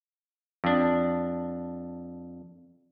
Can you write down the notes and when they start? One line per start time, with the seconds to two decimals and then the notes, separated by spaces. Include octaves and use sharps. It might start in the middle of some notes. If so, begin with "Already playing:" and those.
0.64 F2 D4